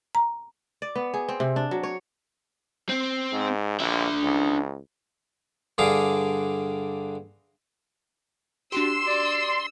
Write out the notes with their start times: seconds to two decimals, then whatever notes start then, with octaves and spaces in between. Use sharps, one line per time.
0.15 A#5
0.82 D5
0.95 B3
1.14 G#4
1.29 C4
1.40 C3
1.56 D4
1.71 F#3
1.83 C#5
2.89 C4
3.32 G#2
3.80 A#1 D4 E5
4.23 C#2
5.78 G2 D3 G#4 F5 D6
8.72 D4 F#4 G4 C6 E6
9.06 D5